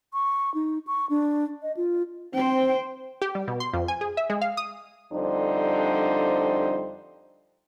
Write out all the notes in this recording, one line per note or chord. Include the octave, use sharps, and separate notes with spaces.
C#6
D#4
C#6
D4
D#5
F4
C4 C5 G5
G4
G3
B2
C6
F2
G#5
G#4
E5
G#3
F5
D#6
F2 D3 G3 D4 D#4 C5